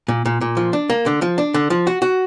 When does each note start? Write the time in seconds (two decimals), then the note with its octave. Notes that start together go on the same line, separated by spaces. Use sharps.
0.08 A#2
0.26 A#2
0.41 A#2
0.57 F3
0.73 D4
0.90 A#3
1.06 D3
1.22 F3
1.38 D4
1.54 D3
1.70 F3
1.87 F#4
2.02 F#4